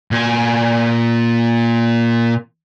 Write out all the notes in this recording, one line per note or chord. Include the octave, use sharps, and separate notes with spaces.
A#2 G#5